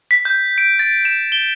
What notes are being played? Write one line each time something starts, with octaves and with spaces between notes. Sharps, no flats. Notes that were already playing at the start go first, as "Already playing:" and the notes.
B6
G6
D7
A6
E7
G7